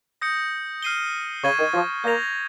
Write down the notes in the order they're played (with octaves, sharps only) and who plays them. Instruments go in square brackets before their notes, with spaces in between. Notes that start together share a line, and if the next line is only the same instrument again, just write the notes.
[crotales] D#6 G6 A#6 C#7
F6 C7 D#7 G7
[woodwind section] C#3 [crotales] C#6 G#6 D#7 G7
[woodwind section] D#3
F3
[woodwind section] A#3 [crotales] G6 A#6 F7